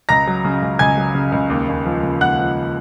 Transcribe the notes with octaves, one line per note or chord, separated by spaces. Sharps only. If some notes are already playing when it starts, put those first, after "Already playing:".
C#2 A#5 A#6
F#3
C#3
C#2
C#2 G#5 G#6
F#3
C#3
C#2
D#2
D#2
F3
C#3
D#2 F#5 F#6
F3